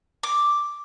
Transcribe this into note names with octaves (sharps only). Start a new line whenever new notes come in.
D6